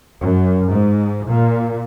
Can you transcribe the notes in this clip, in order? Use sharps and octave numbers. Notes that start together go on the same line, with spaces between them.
F#2
G#2
A#2